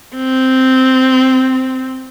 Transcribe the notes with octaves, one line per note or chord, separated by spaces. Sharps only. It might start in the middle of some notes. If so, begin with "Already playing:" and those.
C4